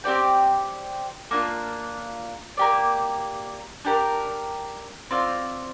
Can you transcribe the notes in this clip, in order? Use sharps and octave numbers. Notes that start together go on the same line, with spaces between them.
C4 G4 D5 G5
A#3 D4 F4
A#3 G4 D5
D4 G4 A#4
C4 F4 D5